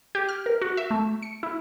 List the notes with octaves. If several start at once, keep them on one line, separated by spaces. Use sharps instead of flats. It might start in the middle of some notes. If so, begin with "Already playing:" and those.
G4
F6
A#4
F#4
E5
A3
C#7
E4